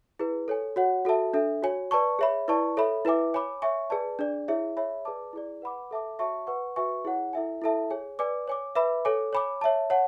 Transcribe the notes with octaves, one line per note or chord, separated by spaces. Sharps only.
E4 G#4 B4
A4 C#5 G#5
F#4 C#5 F#5
F#4 A4 E5 A5
D4 A4 E5
F#4 C#5 G#5
B4 D5 A5 C#6
G#4 C#5 E5 B5
E4 B4 D5 A5 C#6
A4 C#5 E5 B5
E4 B4 E5 G#5 D6
C#5 G#5 B5 D6
C#5 E5 G#5 C#6
G#4 B4 D5 A5
D4 G#4 D5
E4 G#4 C#5 E5
G#4 C#5 E5 G#5 B5
G#4 B4 D5 A5 D6
E4 G#4 D5
B4 F#5 B5 D6
A4 E5 A5 D6
F#4 C#5 E5 A5 C#6
B4 F#5 C#6
F#4 B4 E5 G#5 C#6
E4 G#4 C#5 F#5
E4 A4 E5 G#5
E4 A4 E5 A5
G#4 C#5 G#5
B4 D5 G#5 D6
C#5 G#5 D6
B4 E5 B5 D6
A4 C#5 G#5 D6
C#5 G#5 B5 D6
C#5 E5 A5
C#5 F#5 A5